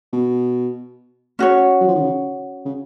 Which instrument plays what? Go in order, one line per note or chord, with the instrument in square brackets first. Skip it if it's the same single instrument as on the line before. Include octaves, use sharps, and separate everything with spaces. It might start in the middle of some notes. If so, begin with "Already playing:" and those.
[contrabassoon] B2
[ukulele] C#4 F#4 C#5
[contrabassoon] F#3
F3
D#3
C#3
C#3